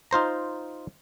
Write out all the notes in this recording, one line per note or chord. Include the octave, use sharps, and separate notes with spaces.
D#4 F4 C5 A#5